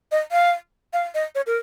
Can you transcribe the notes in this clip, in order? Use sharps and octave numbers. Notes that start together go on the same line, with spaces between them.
D#5
F5
F5
D#5
C#5
A#4